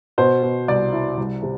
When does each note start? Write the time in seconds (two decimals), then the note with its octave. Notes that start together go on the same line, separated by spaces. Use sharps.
0.18 B2 C5
0.43 B2
0.68 C2 D5
0.93 E4
1.17 C2
1.43 C3